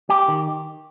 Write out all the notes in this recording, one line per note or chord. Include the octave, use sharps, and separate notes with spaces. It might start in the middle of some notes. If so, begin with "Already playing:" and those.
G4
D#3